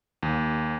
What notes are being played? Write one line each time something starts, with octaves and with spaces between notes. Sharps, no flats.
D#2